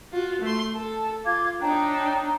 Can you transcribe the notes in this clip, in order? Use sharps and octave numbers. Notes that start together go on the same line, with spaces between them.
F4 F#4
A3 C6
A4 A5
F4 F5 D6 G#6
D4 D#4 C#5 G5 A#5